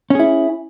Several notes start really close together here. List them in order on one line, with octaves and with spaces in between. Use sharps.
C#4 G#4 E4